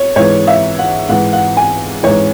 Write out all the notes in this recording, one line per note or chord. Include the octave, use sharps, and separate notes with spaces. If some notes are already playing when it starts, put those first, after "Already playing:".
Already playing: C#5
G#2 E3 C#5
E5
F#5
G#2 E3 F#5
F#5
G#5
G#2 E3 C#5